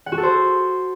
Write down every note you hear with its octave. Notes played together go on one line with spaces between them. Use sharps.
F#5
F#4
A4
C5